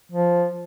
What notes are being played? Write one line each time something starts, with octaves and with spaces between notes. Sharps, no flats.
F3